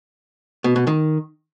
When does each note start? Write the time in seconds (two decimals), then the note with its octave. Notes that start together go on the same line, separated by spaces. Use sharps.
0.64 B2
0.76 B2
0.87 D#3